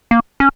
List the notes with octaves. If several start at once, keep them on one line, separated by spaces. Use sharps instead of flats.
A#3
C#4